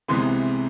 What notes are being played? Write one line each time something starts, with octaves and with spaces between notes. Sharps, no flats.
C2 C3 E3 G#3 B3 C6